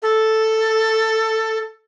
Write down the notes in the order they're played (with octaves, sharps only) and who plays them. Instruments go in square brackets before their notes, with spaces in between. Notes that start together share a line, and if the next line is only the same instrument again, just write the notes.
[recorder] A4